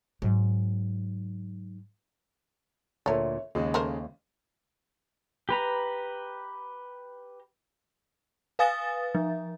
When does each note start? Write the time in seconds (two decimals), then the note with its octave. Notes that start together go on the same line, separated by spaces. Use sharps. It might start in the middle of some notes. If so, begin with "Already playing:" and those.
0.22 G#2 F#3
3.06 D2 A#2 A4 A#4 C#5 E5
3.55 D#2 C#3 G#3 D#5
3.74 A3 A#4 C5
5.49 G4 B4 A#5
8.59 B4 F5 G#5 D#6 A6
9.15 F3